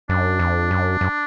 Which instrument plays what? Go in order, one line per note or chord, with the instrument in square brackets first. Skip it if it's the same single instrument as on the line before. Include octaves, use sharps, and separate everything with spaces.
[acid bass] F#2 [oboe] D4
[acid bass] F2
F#2
F#2